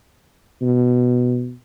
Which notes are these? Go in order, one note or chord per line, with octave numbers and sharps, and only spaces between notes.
B2